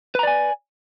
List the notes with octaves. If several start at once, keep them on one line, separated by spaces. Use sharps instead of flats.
B4 D5 G#5 A#5